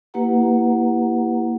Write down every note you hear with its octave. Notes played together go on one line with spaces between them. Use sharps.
A#3 E4 G4 B4 F#5 A#5